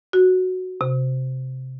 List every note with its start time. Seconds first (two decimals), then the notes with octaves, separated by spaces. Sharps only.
0.13 F#4
0.81 C3